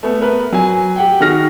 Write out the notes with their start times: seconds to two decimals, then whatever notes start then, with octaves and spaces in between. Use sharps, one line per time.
0.03 A3 B3 A4
0.21 B3 A#4 B4
0.52 F#3 G#5
0.96 G4 F#5 G5
1.20 D#3 F#4 G#4 F6 A#6